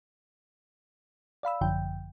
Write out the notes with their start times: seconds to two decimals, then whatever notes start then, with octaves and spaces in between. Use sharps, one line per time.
1.43 D5 F5 B5 E6
1.61 G#1 F#2 D3 F3 G5 G6